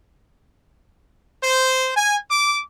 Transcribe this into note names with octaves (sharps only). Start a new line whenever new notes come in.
C5
G#5
D6